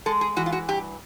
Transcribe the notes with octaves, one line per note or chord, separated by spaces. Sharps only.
G#3 A4
G#4
E3 F#4
F4
F#4
G2 G4